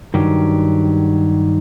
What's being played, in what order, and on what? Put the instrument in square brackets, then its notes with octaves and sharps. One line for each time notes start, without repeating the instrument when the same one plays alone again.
[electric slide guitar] G2 D#3 F#3 G4